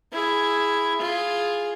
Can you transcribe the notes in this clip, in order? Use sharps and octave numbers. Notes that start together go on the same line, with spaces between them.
E4 G#4
F4 G#4